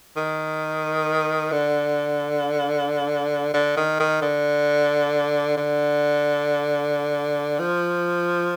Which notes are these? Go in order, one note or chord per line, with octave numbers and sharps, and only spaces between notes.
D#3
D3
D3
D#3
D#3
D3
D3
F3